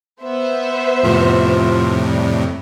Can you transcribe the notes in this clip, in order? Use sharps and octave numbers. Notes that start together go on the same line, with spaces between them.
B3 C5 E5
F2 A2 C3 F4
G3